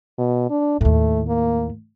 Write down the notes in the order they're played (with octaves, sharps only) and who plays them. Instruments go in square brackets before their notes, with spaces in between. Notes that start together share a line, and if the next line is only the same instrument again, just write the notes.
[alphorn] B2
D4
[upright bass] D#2 A2 [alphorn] A3
[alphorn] A#3